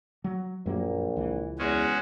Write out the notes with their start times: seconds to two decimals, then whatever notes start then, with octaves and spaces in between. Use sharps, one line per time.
0.24 F#3
0.66 A#1 F#2 F#3 A#3
1.17 C#2 E3
1.59 E2 G#3 C#4 F#4